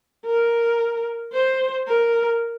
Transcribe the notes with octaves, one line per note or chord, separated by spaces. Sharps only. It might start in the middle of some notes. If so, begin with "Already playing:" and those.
A#4
C5
A#4